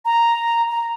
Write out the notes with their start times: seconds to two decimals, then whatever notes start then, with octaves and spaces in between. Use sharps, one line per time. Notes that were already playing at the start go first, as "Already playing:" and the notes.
0.05 A#5
0.69 A#5